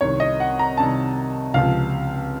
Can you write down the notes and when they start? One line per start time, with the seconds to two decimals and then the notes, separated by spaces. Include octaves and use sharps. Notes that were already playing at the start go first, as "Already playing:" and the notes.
0.01 C2 C3 D#3 C#5
0.20 D#5
0.40 F#5
0.59 A#5
0.77 C2 C3 D#3 A5
1.54 C#2 C3 F3 F5